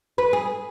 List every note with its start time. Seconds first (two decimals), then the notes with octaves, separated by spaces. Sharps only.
0.18 B4
0.33 G#4